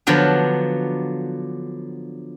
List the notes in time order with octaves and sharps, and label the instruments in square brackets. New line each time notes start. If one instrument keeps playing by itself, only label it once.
[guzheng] D3 F3 F#3 B3 D4